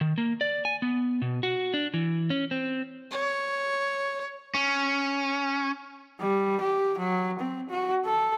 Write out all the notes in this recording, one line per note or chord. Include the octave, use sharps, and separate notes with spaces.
D#3
A#3
D5
G#5
B3
B2
F#4
D4
E3
C#4
C4
C#5
C#4
G3
G4
F#3
C4
F#4
A4